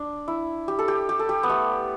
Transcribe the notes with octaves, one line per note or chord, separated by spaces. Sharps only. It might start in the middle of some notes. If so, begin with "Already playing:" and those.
Already playing: D4
E4
G4
A4
G4
G4
A4
G4
B3
A3